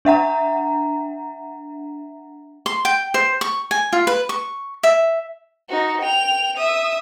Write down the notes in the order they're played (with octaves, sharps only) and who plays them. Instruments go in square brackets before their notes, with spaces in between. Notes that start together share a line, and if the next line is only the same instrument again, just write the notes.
[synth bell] D4 E5 F#5 A#5
[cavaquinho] C6
G5
C5
C#6
G#5
F4
B4
C#6
E5
[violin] D#4 F#4
G5 F7
E5 D#6